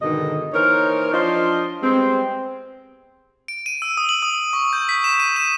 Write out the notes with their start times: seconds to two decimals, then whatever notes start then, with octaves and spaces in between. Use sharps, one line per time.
0.01 G#2 B2 D3 D#3 D#5
0.53 E3 A#3 D#4 A#4 C5 C#5
1.13 F3 D4 F4 C5 D#5
1.83 G3 G#3 B3 C4
3.48 D7
3.66 D#7
3.82 E6
3.97 D#6
4.09 F#7
4.22 D#6
4.53 C#6
4.73 G6
4.89 B6
5.04 E7
5.20 D#7
5.36 E7